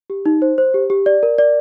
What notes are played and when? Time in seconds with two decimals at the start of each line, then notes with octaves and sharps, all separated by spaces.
0.10 G4
0.26 D#4
0.42 C5
0.58 C5
0.74 G4
0.90 G4
1.06 D5
1.23 A#4
1.38 D5